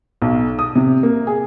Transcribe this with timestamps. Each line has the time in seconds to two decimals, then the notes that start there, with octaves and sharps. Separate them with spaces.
0.22 B1
0.59 D#6
0.76 C3
1.03 A#3
1.27 G#4